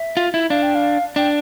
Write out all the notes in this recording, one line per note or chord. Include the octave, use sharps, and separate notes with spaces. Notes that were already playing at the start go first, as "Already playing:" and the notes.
Already playing: E5
F4
E4
D4 F5
G5
F5
D4 G5